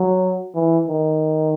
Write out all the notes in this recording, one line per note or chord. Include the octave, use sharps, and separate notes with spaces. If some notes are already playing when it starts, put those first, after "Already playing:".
Already playing: F#3
E3
D#3